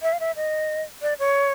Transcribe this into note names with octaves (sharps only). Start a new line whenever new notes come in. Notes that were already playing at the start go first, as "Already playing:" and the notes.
E5
F5
E5
D#5
D5
C#5